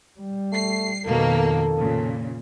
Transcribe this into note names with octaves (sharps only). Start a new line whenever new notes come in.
G3
A3 C7
F2 B2 D#3 A#3 A4
A#2 C#3